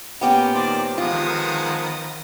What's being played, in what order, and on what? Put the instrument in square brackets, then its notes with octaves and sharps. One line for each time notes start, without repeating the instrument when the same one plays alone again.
[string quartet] A#2 [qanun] B3 G4 G5 [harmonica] C#4
[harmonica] D#3 C5 D5
[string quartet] D#3 D#6 [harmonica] F3 G#3 B3 [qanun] F4